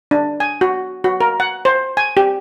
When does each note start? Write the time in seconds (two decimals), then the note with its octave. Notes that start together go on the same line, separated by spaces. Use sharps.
0.11 D4
0.40 G#5
0.61 F#4
1.04 F#4
1.21 A#4
1.40 F#5
1.65 C5
1.97 G#5
2.17 G4